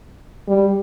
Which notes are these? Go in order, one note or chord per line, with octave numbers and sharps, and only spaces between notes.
G3